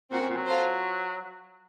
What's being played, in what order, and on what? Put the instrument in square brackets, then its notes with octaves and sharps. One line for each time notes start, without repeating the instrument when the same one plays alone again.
[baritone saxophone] A#2 [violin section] C4 F#4 A#4
[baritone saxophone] F#2
A#2
F#3
[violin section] F4 A4 C5